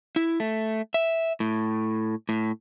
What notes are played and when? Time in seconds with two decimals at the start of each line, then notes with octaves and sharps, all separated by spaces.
0.16 E4
0.40 A3
0.94 E5
1.40 A2
2.29 A2